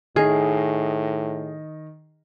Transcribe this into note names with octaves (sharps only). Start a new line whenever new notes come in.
A2 D#3 G#4 A#4 D#5 C7